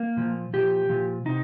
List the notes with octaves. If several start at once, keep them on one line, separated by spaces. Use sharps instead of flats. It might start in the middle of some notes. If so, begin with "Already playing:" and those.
Already playing: A#3
A#2 F3
A#2 F3 G4
A#2 F3
C3 D#4